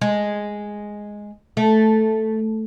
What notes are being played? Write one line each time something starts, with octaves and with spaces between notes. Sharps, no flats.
G#3
A3